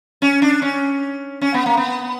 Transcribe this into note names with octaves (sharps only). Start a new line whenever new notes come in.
C#4
D4
C#4
C#4
B3
A#3
B3